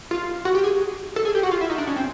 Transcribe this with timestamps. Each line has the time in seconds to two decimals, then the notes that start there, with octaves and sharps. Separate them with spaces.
0.11 F4
0.45 F#4
0.55 G4
0.64 G#4
1.16 A4
1.25 G#4
1.35 G4
1.43 F#4
1.51 F4
1.61 E4
1.70 D#4
1.78 D4
1.87 C#4
1.96 C4